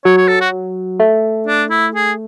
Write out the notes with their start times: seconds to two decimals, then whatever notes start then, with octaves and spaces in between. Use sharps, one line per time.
0.05 F#3 C#5
0.17 C#5
0.28 A4
0.40 F#4
1.00 A3
1.47 D4
1.70 E4
1.95 G#4